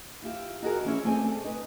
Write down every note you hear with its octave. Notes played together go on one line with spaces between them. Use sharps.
E4 F4 G4 E5
D#4 F#4 G#4 A#4
E3 C#4 C#5 E5
A3 C4 G#4 D5 G#5
A4
D#4 B4